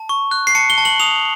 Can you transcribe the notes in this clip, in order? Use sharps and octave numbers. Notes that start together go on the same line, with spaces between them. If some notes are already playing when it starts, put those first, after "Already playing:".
Already playing: A5
C#6
F#6
C7
A5 C#7
G7
A5
F#7
D#6 F7